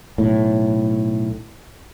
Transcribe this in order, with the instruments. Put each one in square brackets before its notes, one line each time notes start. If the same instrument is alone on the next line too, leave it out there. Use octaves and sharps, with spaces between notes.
[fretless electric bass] B1 A2